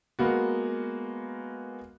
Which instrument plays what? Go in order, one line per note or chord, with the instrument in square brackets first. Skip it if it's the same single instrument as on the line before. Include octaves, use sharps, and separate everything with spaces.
[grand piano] G#3 A#3 B3 F#4